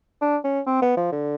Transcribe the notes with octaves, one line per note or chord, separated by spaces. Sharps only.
D4
C#4
C4
B3
F3
D3